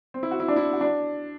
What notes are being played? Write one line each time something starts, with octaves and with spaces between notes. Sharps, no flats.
C4
E4
F#4
E4
D4
E4
F#4
D4